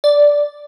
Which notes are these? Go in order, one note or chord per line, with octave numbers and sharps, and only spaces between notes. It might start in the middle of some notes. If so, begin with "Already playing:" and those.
D5